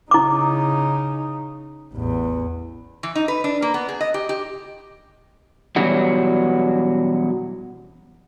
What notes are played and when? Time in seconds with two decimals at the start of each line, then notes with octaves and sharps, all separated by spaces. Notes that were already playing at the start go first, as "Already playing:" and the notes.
0.11 C#3 D#4 E4 D6
1.92 A1 E2
3.03 E3
3.15 D#4
3.28 B4
3.44 D4
3.62 A#3
3.74 B3
3.89 G#4
4.01 D#5
4.14 G4
4.29 G4
5.76 B2 E3 F#3 G3 C#4 F#4